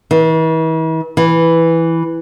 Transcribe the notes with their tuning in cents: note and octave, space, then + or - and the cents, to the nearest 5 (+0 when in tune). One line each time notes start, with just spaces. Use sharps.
E3 -40
E3 +0